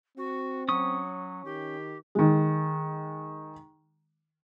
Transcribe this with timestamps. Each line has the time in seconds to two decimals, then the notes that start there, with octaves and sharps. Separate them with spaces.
0.17 C4 F#4
0.68 F#3 C#4 C#6 D#6
1.45 D#3 G4
2.15 D#3 G#3